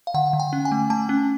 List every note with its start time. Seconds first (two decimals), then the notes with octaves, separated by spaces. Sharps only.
0.07 F5
0.14 D3 F#5
0.33 D3
0.40 G5
0.53 C#4
0.65 G#5
0.71 A3
0.90 A3 A5
1.09 C#4